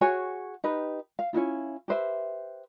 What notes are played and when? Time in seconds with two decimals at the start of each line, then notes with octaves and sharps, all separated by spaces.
0.01 F#4 G#4 C#5 G#5
0.64 D#4 G4 B4
1.19 F5
1.33 C#4 D4 E4 F4
1.88 G4 B4 C5 E5